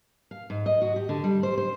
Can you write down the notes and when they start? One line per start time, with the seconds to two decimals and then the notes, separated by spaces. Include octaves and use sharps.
0.31 F5
0.50 G#2
0.66 D#5
0.82 F#4
0.96 G4
1.09 D3
1.24 G3
1.43 C5
1.58 C5